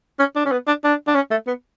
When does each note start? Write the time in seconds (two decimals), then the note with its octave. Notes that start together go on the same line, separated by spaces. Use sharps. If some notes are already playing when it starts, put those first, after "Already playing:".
0.19 C#4
0.35 D4
0.45 C#4
0.52 B3
0.67 D4
0.84 D4
1.07 D4
1.15 C#4
1.31 A3
1.47 B3